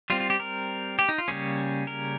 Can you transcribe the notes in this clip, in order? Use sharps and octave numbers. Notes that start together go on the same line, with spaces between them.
G3 C4 F4
F4
G4
A#4
G4
D#4
F4
C#3 G3 A#3 C#4 G#4
A#4